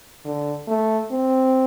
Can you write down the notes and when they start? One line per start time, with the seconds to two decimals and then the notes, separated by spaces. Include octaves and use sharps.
0.25 D3
0.68 A3
1.12 C4